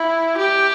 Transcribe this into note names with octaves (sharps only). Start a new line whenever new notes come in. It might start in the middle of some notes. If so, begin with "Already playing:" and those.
Already playing: E4
G4